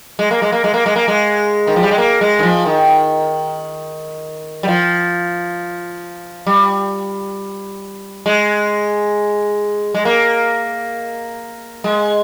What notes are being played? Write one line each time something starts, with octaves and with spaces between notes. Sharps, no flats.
G#3
A#3
G#3
A#3
G#3
A#3
G#3
A#3
G#3
D#3
F3
G3
G#3
A#3
G#3
D#3
F3
D#3
G3
F3
G3
G#3
G#3
A#3
G#3